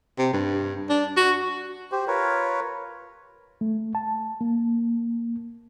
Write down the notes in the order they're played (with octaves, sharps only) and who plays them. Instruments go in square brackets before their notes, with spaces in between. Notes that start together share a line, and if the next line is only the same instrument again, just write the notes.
[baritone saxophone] C3
G2
D4
F#4
[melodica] G4 C5
F4 A#4 B4 C#5
[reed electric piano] A3
A5
A#3